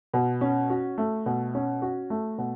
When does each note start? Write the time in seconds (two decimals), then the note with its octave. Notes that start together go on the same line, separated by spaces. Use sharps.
0.14 B2
0.41 C#4
0.70 F#4
0.98 A3
1.26 B2
1.54 C#4
1.82 F#4
2.10 A3
2.38 B2